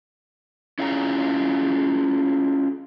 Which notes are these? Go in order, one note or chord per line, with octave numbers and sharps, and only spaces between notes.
C#4 E4 F4 G#4 G5 A#5